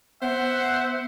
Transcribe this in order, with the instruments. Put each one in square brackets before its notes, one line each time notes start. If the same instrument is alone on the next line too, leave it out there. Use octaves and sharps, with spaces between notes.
[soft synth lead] B3 [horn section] C5 E5 F#5